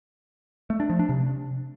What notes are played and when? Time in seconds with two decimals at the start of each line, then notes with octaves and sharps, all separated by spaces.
0.70 A3
0.80 D4
0.90 F3
0.99 D4
1.09 C3